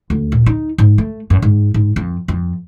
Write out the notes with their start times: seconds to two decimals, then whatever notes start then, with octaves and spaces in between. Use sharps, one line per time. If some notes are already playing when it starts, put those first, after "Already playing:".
0.10 D2
0.32 A#2
0.46 D#4
0.78 G#2
0.98 A3
1.30 F#2
1.42 G#2
1.74 G#2
1.96 F2
2.28 F2